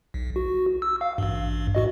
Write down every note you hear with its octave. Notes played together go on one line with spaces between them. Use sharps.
B1
F#4
E6
F5
A1 G2
G#2 F#4 D#5